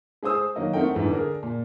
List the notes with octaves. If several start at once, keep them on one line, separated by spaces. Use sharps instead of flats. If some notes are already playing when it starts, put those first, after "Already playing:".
G#3 G#4 C5 D#6 E6
D#3 F#3 A#3 D#5
A3 C4 D#4 A#4 F#5 G5
G1 G#2 E3
D3 D4 G#4 A#4
A#2